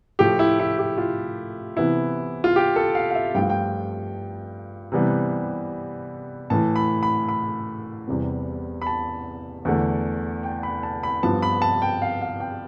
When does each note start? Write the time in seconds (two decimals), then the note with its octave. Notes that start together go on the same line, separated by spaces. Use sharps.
0.19 A2 F3 A3 G4
0.39 E4
0.59 E4
0.79 G4
0.98 F4
1.77 C3 E3 B3 E4
2.44 F4
2.56 G4
2.76 A4
2.95 F5
3.10 F5
3.15 E5
3.35 G2 F3 A3 G5
3.42 F5
3.50 G5
4.92 C3 E3 G3 B3
6.50 A2 E3 A3 A5
6.76 B5
7.03 B5
7.28 B5
8.07 E2 C3 E3 G3 B3
8.82 B5
8.87 A5
9.65 E2 D3 A3
10.43 G5
10.63 B5
10.83 A5
11.03 B5
11.23 G2 F3 B3 A5
11.42 B5
11.62 A5
11.82 G5
12.02 F5
12.21 F5
12.40 G5